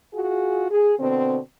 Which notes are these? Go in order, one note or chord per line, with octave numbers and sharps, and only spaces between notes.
F4 F#4 G#4
G#4
B2 D3 C4